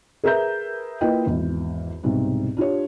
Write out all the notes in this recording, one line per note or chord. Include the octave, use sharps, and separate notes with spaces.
G#4 A#4 B4 E5 A#5 G6
A#3 E4 F4 B4 D#5 G5
G#1 E2
C2 G#2 B2
D4 F4 G4 C#5